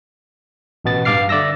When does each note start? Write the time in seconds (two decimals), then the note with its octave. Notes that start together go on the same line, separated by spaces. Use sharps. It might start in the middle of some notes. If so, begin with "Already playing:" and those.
0.85 A1 B2 B3 A6
1.05 G2 F5 D6 F6 C7
1.29 D3 D5 E5 E6 A#6